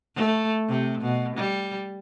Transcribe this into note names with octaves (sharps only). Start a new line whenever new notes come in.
A3
C3
B2
G3